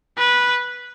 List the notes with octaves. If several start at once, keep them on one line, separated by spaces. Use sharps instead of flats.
B4